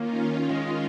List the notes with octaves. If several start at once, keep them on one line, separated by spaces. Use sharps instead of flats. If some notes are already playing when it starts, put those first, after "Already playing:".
Already playing: D#3 A#3 C#4 F4
G#3